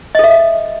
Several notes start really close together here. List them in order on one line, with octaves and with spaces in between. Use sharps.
D#5 A4 E5